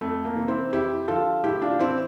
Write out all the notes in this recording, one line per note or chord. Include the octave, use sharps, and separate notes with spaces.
F2 A3
A#3
C3 E3
C4 E4
F2 E4 G4
D3 F3 F4 A4
A2 E4 G4
D4 F4
E3 C4 E4